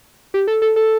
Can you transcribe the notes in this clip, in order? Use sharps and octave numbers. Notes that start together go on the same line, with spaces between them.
G4
A4
A4
A4